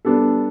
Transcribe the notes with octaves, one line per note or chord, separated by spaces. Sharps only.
G3 B3 D4 A4